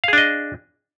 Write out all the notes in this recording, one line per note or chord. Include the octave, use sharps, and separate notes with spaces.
D4 G#4 D#5 F5